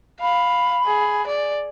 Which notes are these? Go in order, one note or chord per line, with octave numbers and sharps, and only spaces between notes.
F5 B5
G#4
D5